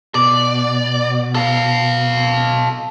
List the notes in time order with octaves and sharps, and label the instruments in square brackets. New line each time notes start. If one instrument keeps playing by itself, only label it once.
[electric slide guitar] B2 [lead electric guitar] D5
[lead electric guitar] A4 F5